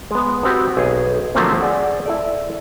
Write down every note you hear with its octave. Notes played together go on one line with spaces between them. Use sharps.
G#3 B3
B3 C4 F#4 G4
B1 G#4
D3 F3 F#3 A3 A#3 C4
G#4 D5 F#5
E4 A4 D5